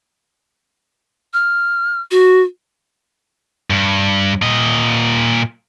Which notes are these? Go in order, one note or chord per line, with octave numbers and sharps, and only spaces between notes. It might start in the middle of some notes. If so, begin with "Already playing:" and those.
F6
F#4
G2
A#2 D#5